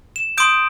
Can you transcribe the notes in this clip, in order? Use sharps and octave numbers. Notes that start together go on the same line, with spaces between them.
E7
C6 D#6 G6 D7